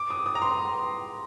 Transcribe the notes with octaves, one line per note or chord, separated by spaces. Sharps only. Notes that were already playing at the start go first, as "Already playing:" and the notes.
Already playing: D6
D#6
D#6
A#5
C6